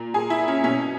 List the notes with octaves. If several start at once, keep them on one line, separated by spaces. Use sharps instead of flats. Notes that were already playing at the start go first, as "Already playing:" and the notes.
Already playing: A#2
A#2 G#4
E4
C#4
B2 C#4